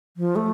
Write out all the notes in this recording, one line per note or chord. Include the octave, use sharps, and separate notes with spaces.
F3
A3